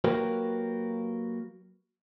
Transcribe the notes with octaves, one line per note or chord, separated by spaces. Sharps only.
F#3 A#3 F#4 G4 A#4 B4